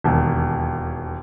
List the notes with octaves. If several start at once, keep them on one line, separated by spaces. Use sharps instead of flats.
E1 D#2